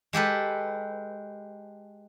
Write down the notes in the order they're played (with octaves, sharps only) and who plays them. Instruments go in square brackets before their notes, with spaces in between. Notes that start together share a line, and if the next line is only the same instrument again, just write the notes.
[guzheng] G#3 G4 A4 B4